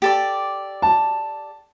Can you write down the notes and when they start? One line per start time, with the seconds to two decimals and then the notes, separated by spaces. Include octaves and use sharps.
0.02 G4 A4 D5
0.82 A5